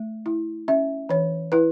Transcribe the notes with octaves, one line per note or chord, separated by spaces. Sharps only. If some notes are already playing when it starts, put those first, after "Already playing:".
Already playing: A3
E4
C#4 E5
E3 C#5
E4 B4